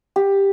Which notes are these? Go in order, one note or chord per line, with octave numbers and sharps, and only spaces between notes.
G4